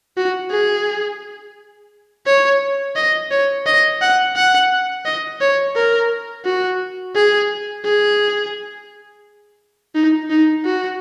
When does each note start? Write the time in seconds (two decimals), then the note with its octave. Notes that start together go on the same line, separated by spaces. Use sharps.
0.17 F#4
0.51 G#4
2.27 C#5
2.96 D#5
3.31 C#5
3.66 D#5
4.02 F#5
4.36 F#5
5.06 D#5
5.41 C#5
5.76 A#4
6.46 F#4
7.16 G#4
7.85 G#4
9.95 D#4
10.30 D#4
10.65 F#4